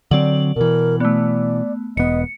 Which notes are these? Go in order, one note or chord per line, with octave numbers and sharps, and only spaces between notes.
D3 F#3 C4 D5 F#7
B2 E3 A#4
A3 B3 D5
E1 B3 D#5 C#7